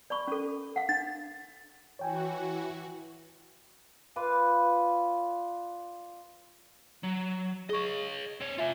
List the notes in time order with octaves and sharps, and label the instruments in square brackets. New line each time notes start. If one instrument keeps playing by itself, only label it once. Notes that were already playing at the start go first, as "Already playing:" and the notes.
[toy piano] D5 B5 C#6
C#4 A4
F5 F#5
[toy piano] D4 [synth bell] A6
[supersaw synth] E3 F#4 [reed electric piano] C#5 G5 G#5
[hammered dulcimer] F4 B4 D5 F5
[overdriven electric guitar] F#3
[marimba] G#4 C#6 [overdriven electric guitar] C#5 D#5
[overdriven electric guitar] C4 C#5
[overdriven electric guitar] F4 G#5 [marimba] E5